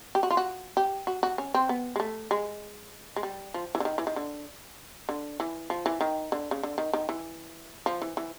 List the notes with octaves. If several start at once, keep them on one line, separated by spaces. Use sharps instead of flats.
G4
F#4
F4
F#4
G4
F#4
F#4
C#4
C4
B3
G#3
A3
G#3
G#3
G3
F3
E3
D3
D#3
E3
D#3
D3
D3
E3
F3
E3
D#3
D3
C#3
D3
D#3
D#3
E3
F3
E3
E3